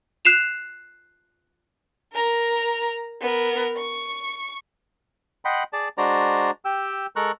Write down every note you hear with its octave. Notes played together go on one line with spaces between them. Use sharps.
F#6 C7 E7 F7
A#4 A#5
B3 A#4
C#6
D#5 F#5 G5 B5 C6
G#4 D5 A5
G#3 D4 F#4 C5 D5 A#5
G4 G5 E6
G#3 A4 A#4 A#5 C#6 F#6